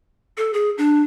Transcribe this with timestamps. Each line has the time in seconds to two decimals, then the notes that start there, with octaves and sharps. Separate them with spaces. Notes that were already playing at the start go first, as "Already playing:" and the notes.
0.37 A4
0.54 G#4
0.78 D4